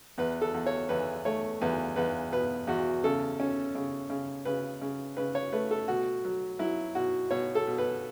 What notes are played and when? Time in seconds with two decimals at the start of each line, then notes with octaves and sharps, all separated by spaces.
0.18 E2 B4
0.42 A4
0.54 E2
0.66 C#5
0.89 E2 B4
1.25 A3 C#5
1.61 E2 B4
1.96 E2 B4
2.32 B2 B4
2.67 E2 F#4
3.04 C#3 A4
3.40 C#4
3.75 C#3
4.10 C#3
4.45 C#3 B4
4.82 C#3
5.17 C#3 B4
5.35 C#5
5.53 A3 B4
5.71 A4
5.88 B2 F#4
6.25 F#3
6.59 F#3 E4
6.95 B2 F#4
7.31 B2 C#5
7.55 A4
7.67 B2
7.78 B4